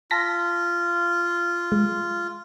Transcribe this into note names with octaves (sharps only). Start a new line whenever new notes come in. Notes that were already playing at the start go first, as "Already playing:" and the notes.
F4 A5 A#6 B6
G#3